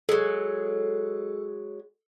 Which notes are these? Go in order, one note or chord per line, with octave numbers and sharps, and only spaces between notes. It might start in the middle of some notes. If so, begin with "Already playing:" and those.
F#3 G#3 A4